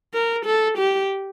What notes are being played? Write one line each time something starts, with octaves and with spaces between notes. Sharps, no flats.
A#4
A4
G4